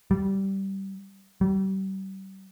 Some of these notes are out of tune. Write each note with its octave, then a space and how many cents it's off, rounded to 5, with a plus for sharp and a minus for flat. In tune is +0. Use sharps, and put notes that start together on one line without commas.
G3 -15
G3 -35